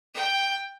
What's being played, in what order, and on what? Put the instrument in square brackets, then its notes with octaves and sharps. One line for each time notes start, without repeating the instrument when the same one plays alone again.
[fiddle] G5